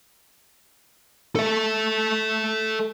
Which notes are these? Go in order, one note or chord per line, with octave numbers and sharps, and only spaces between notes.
A4 E5